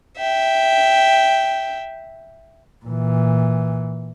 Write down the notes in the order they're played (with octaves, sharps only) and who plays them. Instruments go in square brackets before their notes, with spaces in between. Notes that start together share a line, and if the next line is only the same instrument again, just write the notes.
[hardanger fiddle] E5 G5
[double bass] A#2 E3